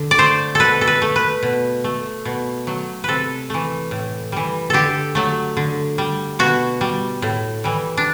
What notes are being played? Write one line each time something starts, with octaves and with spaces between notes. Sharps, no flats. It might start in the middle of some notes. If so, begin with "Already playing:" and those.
Already playing: D3
D5
A3 C5
B2 A4 B4
A4
B4
A3
B4
B2
A3
B2
F#3 A3
C3 A4 B4
E3 A3
A2
E3 G3
D3 G4 A4
F#3 A3
D3
G3
B2 F#4
G3
A2
E3 G3
D4